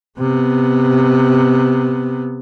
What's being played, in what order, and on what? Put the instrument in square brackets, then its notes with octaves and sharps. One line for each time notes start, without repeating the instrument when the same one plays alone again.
[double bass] C3 B3